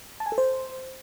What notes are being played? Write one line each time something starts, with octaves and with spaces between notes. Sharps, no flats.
A5
G#5
A4
C5